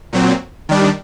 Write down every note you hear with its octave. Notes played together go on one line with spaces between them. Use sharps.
A#2 F#3 C4
D#3 G3 D4